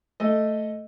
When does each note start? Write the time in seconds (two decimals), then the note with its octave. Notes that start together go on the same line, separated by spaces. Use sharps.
0.20 A3 D#5